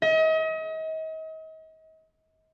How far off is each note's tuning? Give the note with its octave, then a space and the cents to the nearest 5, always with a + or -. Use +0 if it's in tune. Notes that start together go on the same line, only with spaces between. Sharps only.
D#5 +40